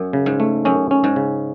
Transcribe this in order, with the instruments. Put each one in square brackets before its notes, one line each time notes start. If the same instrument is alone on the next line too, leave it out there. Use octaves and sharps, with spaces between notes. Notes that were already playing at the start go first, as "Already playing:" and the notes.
Already playing: [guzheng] F#2
[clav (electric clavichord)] C#3
[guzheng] G#2
[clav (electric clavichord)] A3
[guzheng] F#2 [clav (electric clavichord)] C#4
[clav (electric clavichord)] C#4
[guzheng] G#2
[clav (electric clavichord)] C#3